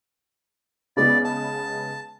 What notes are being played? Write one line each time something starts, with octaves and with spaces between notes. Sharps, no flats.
C#3 G#3 B3 D5
A5